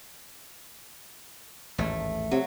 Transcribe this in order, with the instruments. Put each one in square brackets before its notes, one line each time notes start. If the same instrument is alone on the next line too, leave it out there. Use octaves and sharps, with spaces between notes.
[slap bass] A1 D#2 G#2 [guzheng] A3
[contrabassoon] C3 [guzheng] F#3